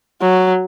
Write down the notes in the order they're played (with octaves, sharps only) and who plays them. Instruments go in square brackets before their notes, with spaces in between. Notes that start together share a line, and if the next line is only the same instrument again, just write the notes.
[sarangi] F#3